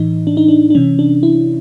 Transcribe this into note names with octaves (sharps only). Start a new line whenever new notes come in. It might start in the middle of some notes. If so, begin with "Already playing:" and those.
Already playing: A2 E3 D#4
D4
D#4
D4
D4
C3 E3 C#4
D4
E4